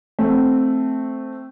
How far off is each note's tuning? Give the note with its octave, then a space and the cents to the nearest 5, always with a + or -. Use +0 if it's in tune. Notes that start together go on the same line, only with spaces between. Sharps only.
A3 +0 C4 +0